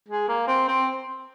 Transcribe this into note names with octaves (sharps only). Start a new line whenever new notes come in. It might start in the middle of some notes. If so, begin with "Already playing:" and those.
G#3
A#3
C4
C4